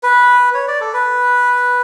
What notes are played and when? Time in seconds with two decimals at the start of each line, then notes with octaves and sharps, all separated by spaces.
0.03 B4
0.54 C#5
0.68 D5
0.81 A4
0.94 B4